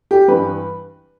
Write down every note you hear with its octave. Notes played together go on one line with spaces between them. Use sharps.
G4
G2 E3 G3 B4